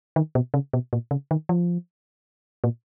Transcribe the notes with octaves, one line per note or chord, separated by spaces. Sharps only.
D#3
B2
C#3
B2
A#2
C#3
D#3
F3
A#2